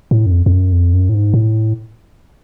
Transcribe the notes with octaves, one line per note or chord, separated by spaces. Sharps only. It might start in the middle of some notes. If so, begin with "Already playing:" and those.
A2
F#2
F2
F2
F#2
F2
F#2
A2
G#2
A2